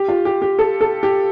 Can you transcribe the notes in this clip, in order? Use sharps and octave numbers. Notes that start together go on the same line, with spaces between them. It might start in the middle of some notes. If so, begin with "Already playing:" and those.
Already playing: G4
F4
G4
G4
A4
A4
G4